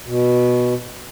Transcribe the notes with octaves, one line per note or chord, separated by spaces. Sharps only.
B2